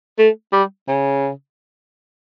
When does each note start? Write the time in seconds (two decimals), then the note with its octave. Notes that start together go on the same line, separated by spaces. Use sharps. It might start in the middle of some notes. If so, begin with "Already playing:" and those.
0.19 A3
0.53 G3
0.88 C#3